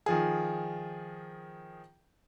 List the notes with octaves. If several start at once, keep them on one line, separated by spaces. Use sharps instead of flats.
D#3 F3 G#4